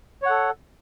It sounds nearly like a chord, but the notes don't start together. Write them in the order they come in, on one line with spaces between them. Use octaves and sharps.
C#5 F#5 A4